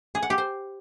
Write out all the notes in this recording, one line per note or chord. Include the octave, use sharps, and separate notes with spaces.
G#4
F#5
G4
C5